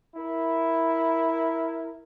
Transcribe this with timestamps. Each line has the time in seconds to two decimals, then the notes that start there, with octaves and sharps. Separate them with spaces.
0.15 E4 A#4